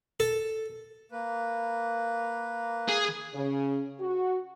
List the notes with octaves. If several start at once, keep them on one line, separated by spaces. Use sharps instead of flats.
A4
A#3 B4
G#4
C#3
F#4